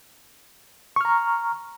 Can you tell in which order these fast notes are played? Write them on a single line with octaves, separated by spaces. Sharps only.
C#6 F6 A#5